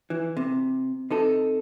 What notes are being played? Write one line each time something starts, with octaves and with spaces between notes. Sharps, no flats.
E3
C3
C3 D#4 A4